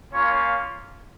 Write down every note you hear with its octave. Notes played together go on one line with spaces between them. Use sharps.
A#3 C#4 F4 C#5